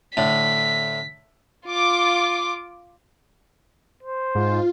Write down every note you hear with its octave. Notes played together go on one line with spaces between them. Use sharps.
A2 D3 B6
F4 D6
C5
G#2 F4